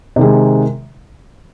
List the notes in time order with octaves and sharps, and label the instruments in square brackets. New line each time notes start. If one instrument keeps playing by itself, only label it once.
[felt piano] C3 D#3 G#3